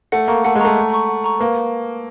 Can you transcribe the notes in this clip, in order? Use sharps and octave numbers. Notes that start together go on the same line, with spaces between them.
A3 F#5
A#3 A#5 C#6
A3 F#5
G#3
A3 A#5 C#6
F#5
A#5 C#6
F#5
A#5 C#6
A#3 B4